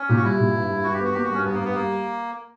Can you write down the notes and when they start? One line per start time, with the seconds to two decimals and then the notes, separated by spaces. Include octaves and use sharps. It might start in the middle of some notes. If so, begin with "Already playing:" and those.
Already playing: C#4
0.09 A#2 G4
0.17 F#4
0.24 G3 E4
0.39 A#2
0.54 G2
0.69 G2
0.84 G2 F#4
0.94 G4
1.00 B3 F#4
1.14 A#3 G4
1.23 F#4
1.29 G2
1.34 C#4
1.44 G2 B3
1.54 A#3
1.59 G2
1.65 B3
1.74 G3 A#3